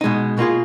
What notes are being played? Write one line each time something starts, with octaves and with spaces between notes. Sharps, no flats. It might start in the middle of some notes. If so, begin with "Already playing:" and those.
B2 G#3 D#4
B2 A#3 F4 G#4